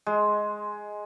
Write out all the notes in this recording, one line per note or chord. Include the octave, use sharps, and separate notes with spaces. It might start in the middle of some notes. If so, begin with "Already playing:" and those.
G#3